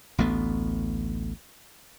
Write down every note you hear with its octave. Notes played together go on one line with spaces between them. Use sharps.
A1 D2 A3 B3